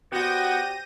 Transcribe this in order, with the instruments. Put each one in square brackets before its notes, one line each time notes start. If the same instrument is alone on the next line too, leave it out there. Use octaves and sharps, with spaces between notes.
[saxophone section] B3 F#4 [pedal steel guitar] G4 C5 D5 [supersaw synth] G6 A#6 D#7